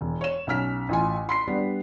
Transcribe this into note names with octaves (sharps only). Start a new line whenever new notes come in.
E1
C#5 E7
B1 C#4 F6 B6
A1 F4 G#5
C6 B6 C7
G3 B3 D4